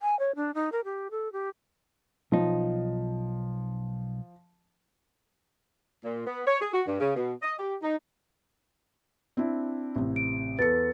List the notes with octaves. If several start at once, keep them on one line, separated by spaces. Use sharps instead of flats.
G#5
C#5
D4
D#4
A#4
G4
A4
G4
B1 F3 D#4
A#2
B3
C#5
G#4
F#4
G2
C#3
B2
D#5
G4
D#4
C4 D4 E4
A1 C3
D7
E2 A4 B4 A6 C#7